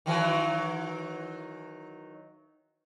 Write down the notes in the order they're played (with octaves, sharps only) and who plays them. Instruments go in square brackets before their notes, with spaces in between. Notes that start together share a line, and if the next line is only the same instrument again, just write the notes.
[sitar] D#3 E3 F#3